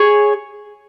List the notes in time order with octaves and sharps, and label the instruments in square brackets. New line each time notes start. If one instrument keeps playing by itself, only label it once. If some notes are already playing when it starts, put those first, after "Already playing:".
Already playing: [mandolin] G#4 C#5 G#5